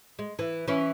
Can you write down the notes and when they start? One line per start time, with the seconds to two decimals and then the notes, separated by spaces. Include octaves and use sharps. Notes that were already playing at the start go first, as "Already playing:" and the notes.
0.19 G#3
0.39 E3
0.68 E3 C#4